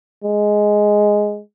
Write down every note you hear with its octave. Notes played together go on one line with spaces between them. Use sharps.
G#3